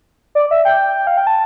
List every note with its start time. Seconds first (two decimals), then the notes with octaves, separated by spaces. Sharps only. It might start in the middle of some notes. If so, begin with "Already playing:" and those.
0.35 D5
0.51 E5
0.65 G5
1.07 F5
1.17 G5
1.27 A5